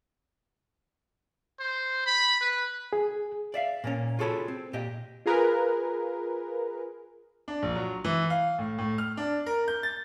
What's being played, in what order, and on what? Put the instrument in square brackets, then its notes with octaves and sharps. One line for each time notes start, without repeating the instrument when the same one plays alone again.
[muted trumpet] C5
B5
B4
[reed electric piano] G#4
[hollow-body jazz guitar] D5 E5 F5
A#2 A#3 C#4
F4 F#4 G#4 A4 C#5 B5
C4
A#2 G4 D#5 G5
[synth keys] F4 G#4 A#4 B4
[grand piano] D4
A#1
F#3
E3
F5
A2
A2
F6
D4
A#4
G6
A6